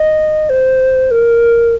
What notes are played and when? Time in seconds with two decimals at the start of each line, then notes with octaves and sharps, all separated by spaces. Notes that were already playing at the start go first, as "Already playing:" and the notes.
Already playing: D#5
0.50 C5
1.11 A#4